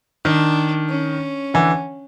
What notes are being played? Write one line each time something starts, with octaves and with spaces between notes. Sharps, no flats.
D#3 D4
C#4
D3 E3